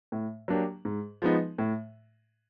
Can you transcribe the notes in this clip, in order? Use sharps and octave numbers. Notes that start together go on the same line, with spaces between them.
A2
F#3 A#3 D4 G4
G#2
F3 G#3 B3 D#4
A2